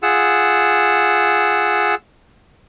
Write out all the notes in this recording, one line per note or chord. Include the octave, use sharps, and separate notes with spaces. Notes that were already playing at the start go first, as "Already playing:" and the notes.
F4 G#4 F#5 E6